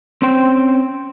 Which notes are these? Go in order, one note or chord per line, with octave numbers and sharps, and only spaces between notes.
C4 C#4 C5 G5